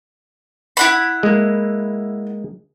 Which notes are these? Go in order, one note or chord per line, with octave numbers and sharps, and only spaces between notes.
E4 F#5 B5
G#3 A#3